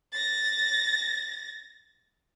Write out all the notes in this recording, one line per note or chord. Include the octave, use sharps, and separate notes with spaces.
A6 A#6